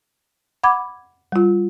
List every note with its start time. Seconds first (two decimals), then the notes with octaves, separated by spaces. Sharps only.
0.64 F#5 B5 D6 G#6
1.32 G3 F4